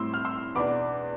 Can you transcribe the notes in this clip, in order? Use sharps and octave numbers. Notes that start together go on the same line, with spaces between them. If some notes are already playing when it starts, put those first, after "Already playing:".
Already playing: A2 G3 C4 E4 C6 E6
F6
C6 E6
E2 B2 B3 D4 B5 D6